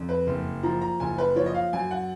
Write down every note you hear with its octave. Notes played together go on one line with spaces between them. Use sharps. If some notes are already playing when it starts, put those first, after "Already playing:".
Already playing: F2
B4
F#1
F3 A#5
A#5
F#1 G#5
B4
F3 C#5
D#5
F5
F#2 G#5
F#5